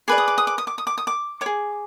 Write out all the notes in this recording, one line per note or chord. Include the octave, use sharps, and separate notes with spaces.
G#4 B4 D5 D6
D#6
D6
D#6
D6
D#6
D6
D#6
D6
D#6
D6
G#4 C#5 D6